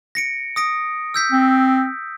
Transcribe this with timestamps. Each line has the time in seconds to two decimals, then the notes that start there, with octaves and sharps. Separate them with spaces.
0.15 A#6 C#7 D7
0.56 D#6 A#6 D7
1.14 E6 G6 B6
1.32 C4